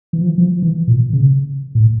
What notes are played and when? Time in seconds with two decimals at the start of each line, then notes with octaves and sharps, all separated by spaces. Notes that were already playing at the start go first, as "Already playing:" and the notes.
0.13 E3
0.21 F3
0.29 E3
0.38 F3
0.62 E3
0.88 A#2
1.13 C#3
1.75 A2